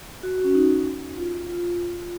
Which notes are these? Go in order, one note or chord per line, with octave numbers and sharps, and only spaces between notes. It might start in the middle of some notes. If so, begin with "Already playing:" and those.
F#4
C#4
D#4
F4
F4